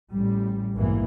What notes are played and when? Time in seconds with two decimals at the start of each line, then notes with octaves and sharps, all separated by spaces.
0.12 A1 G3
0.75 A#1 F2 G#2 B2 E3 A#3